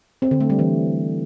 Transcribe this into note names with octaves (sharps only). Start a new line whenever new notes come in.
C4
D3
A3
G3
E3